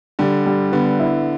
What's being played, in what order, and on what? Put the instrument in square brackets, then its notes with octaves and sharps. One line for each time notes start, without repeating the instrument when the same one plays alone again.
[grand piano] D3 [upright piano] G3
[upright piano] G3
[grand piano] D3 [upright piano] B3
[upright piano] E4